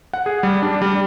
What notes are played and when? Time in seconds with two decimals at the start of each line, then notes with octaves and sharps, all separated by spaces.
0.13 F#5
0.26 G#4
0.43 G3
0.62 D4
0.82 G3